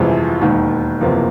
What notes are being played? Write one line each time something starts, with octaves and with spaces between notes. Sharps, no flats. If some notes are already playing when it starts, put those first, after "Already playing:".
Already playing: G1 F2 C3 E3 G#3
E1 D#2 D#3
F#1 E2 C3 F3 A#3